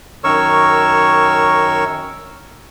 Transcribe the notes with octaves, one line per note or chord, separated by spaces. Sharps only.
F#2 D#3 A#4 C#5 C#6 E6